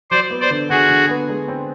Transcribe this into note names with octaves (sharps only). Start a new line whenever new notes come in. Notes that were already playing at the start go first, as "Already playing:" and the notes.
F#3 C5 D5
B3
C5 D5
D3
D3 F#4 G#4
D3
B3
G#3
C4